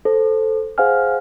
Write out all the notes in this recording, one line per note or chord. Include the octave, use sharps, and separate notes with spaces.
A4 C5
G#4 C5 F5 F#5 G#5 F6